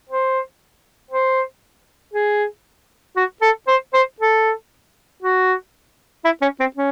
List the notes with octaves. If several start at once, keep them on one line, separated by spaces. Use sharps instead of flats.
C5
C5
G#4
F#4
A4
C5
C5
A4
F#4
E4
C#4
C4
C#4